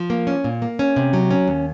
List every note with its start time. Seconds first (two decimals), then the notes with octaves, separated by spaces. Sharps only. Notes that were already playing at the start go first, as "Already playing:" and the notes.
Already playing: F3
0.10 A#3
0.27 C#4
0.44 A#2
0.62 A#3
0.79 C#4
0.96 C3
1.13 F#3
1.31 C#4
1.48 D#2